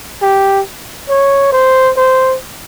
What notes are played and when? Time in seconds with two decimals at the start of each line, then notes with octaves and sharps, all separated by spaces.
0.22 G4
1.09 C#5
1.52 C5
1.97 C5